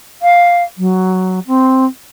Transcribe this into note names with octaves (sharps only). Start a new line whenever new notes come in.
F5
F#3
C4